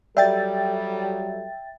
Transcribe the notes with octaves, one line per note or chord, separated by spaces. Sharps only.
F#3 G3 A4 D5 E5 G5 A6